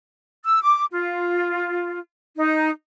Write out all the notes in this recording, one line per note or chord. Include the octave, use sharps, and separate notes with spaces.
E6
D6
F4
D#4